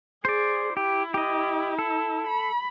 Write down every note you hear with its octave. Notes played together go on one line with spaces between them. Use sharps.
G#4 C5 D5
E4 G4
G4 D#5
A4
B5